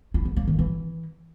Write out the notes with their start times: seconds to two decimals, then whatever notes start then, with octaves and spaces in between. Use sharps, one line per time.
0.14 E4
0.25 B3
0.36 A#3
0.48 D#3
0.59 E3